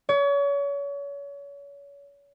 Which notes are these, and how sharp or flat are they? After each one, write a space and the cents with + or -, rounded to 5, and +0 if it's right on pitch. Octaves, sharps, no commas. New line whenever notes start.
C#5 +35